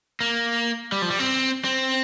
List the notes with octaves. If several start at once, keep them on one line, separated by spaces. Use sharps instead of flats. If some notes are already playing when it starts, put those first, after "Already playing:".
A#3
G3
F3
G3
C4
C4